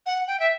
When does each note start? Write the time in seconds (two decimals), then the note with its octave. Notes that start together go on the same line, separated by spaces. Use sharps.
0.06 F#5
0.27 G5
0.40 E5